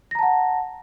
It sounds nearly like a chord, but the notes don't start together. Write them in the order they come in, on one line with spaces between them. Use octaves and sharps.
A#6 A#5 A5 F#5